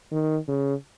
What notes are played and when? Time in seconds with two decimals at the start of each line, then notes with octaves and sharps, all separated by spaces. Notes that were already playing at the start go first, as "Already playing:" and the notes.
0.11 D#3
0.48 C#3